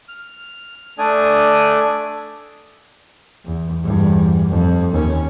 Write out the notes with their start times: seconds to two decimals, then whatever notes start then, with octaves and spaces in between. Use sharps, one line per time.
0.08 F6
0.98 A3 D4 D5 G#5 D#6
3.44 E2
3.83 E2 G2
4.49 F2
4.92 D#2 C#4